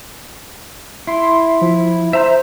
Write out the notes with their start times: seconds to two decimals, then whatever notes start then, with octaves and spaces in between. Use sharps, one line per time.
1.07 E4 C6
1.61 F3
2.13 C5 E5 A#5 G6